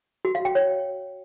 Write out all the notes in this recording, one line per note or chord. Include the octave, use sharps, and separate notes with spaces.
F#4
F5
G5
C#5